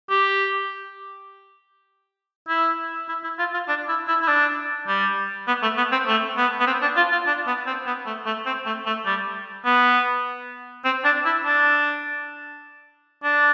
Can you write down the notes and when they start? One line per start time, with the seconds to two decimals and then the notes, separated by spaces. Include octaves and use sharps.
0.10 G4
2.49 E4
3.09 E4
3.24 E4
3.39 F4
3.54 F4
3.68 D4
3.88 E4
4.08 E4
4.22 E4
4.28 D4
4.88 G3
5.47 B3
5.63 A3
5.78 B3
5.92 C4
6.07 A3
6.37 B3
6.60 B3
6.67 C4
6.82 D4
6.97 F4
7.12 F4
7.27 D4
7.47 B3
7.66 C4
7.86 B3
8.06 A3
8.26 A3
8.46 C4
8.66 A3
8.86 A3
9.06 G3
9.65 B3
10.85 C4
11.05 D4
11.25 E4
11.45 D4
13.24 D4